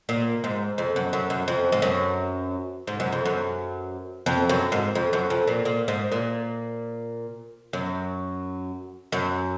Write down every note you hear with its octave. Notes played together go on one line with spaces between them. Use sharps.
A#2
G#2
F2
F#2
F#2
F#2
F2
G#2
F#2
G#2
F#2
F2
F#2
F2
F#2
G#2
F2
F#2
F2
A#2
A#2
G#2
A#2
F#2
F#2